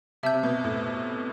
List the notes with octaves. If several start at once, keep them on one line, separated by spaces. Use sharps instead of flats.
C3 E5 A5 E6 G6
C3
B2
A2